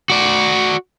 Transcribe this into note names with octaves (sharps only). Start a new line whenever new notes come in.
F#4 D5